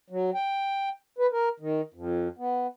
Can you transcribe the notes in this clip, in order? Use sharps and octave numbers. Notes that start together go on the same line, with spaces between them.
F#3
G5
B4
A#4
D#3
F2
B3